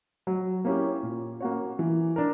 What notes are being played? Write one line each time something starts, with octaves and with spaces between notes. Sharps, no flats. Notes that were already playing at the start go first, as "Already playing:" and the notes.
F#3
A#3 C#4 E4 G4
A#2
A#3 C#4 F#4 C#5
E3
D4 A#4